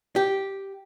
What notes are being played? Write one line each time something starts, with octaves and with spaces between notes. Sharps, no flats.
G4